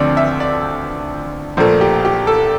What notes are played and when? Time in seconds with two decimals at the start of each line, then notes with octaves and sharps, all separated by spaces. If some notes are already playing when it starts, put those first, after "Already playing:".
Already playing: D2 D3 F3 C4 D5
0.17 E5
0.40 D5
1.57 A#1 A#2 A3 C5
1.81 G4
2.05 G4
2.27 A4